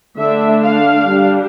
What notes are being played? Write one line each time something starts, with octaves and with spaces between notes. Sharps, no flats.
D3 A3 D4 E5
F5
G3 D4